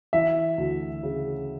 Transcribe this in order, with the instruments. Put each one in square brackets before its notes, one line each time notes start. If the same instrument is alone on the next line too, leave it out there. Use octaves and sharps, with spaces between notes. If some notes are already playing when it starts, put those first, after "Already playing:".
[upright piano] E3 E5
D2
C#3